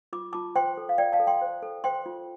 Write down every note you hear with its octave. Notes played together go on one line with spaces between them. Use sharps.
F4 D6
F4 A5 D6
C5 G5 C6
A4
F5
F4 D5 G5
F5 A5
A4
G5 C6
C5
A4
C5 G5 C6
F4